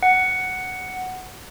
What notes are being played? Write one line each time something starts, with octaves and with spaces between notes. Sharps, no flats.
F#5